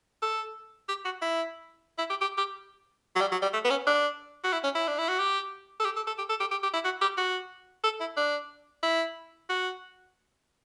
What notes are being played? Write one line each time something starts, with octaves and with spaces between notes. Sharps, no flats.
A4
G4
F#4
E4
E4
G4
G4
G4
F#3
G3
F#3
G3
A3
B3
C#4
D4
F#4
E4
C#4
E4
D4
E4
F#4
G4
A4
G4
A4
A4
G4
A4
G4
G4
G4
E4
F#4
G4
F#4
A4
E4
D4
E4
F#4